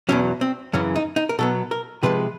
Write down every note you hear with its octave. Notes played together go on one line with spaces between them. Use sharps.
E2 B2 F#3 C#4
C4
F#2 C#3 E3 C#4
D#4
D#4
A#4
B2 F#3 B3 A4
A#4
C3 F3 G#3 B4